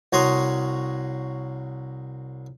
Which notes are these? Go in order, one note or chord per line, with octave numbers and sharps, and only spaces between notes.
C2 F#4 C#5 A#5 C6 D#6